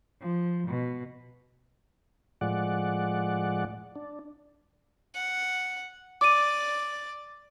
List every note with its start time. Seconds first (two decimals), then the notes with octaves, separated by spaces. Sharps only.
0.21 F3
0.68 B2
2.41 A2 F3 G#3 D5 F#5
3.96 D4
5.15 F#5
6.21 D5 D6 D#7